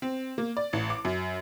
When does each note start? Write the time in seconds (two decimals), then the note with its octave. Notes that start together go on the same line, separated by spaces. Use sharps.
0.02 C4
0.38 A#3
0.57 D5
0.73 A1
0.90 D6
1.05 F#2